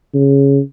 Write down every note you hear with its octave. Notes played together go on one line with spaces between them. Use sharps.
C#3